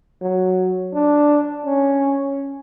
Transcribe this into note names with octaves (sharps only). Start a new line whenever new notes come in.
F#3
D4
C#4